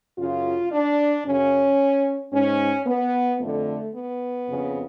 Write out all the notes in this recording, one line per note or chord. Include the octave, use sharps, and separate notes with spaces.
F#2 C#3 F4
D4
F#2 C#3 C#4
G#2 C#4
B3
F2 D3 A3
B3
F2 C#3